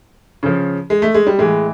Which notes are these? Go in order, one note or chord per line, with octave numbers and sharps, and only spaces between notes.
C#3 F3
G#3
A3
G#3
G3
A2 E3 G#3